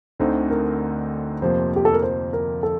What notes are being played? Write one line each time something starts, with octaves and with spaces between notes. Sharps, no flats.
D2 D3 A3 C4 D#4 C5
A#4
F2 C3 F3 A#3 C5
G4
A4
A#4
C5
A#4
A4